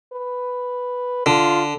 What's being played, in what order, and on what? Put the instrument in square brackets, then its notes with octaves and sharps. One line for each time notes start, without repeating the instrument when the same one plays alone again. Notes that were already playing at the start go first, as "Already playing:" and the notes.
[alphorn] B4
[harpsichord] D3 [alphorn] F4